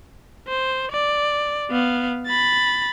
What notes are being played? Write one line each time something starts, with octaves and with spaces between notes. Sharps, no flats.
C5
D5
B3 F5
B5 A6